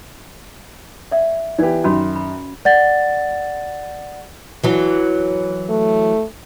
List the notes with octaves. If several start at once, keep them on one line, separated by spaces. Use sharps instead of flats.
D5 E5 F#5
E3 B3 G4 D5
F#2 D#3 C#4 F#4 B5
B5
D5 F#5 A6
E3 F#3
A3